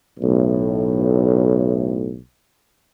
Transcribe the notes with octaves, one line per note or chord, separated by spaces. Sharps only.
B1 A2